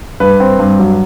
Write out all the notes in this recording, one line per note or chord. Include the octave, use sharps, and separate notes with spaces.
G2 B4
C4
G2
F#3